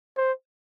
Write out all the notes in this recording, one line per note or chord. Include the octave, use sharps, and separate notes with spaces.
C5